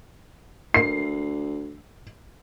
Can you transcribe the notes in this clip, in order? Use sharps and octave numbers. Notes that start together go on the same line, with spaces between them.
D2 C7